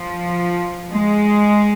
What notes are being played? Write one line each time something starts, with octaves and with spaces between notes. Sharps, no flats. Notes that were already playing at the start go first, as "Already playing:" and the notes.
Already playing: F3
G#3